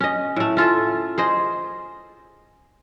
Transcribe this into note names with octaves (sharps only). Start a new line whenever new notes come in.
C#4 D#5
A2 A3
C#4 F4 A4
G#4 C5 D#5